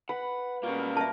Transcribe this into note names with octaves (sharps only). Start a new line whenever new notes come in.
B4 F#5
B2 G3 A#3 C#4 F4
A#4 E5 A5